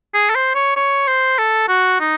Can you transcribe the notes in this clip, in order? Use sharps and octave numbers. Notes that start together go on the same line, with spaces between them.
G#4
A4
C5
C#5
C#5
C5
A4
F#4
D#4